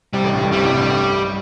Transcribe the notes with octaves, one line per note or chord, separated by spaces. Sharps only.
C2 C3 G3
A1 A2
G2
G2
C2 C3 G3
A1 A2
G2
G2